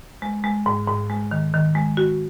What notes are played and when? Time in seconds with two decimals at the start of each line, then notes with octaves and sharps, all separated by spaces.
0.22 G#3
0.44 G#3
0.66 G#2
0.88 G#2
1.10 G#3
1.31 D#3
1.54 D#3
1.75 G#3
1.97 F#4